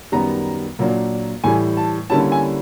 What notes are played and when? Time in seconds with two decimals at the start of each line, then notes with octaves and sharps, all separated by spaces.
0.12 F#2 D#3 G3 B3 A#5
0.79 A#2 F#3 A#3 D4
1.44 A2 E3 G3 G#5
1.77 A5
2.10 D3 G3 A#3 C#4 E4 A5
2.32 G#5